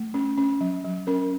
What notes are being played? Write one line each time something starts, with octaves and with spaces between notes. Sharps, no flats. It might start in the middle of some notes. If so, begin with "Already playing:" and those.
Already playing: A3
C#4
C#4
F#3
F#3
C#4 A#4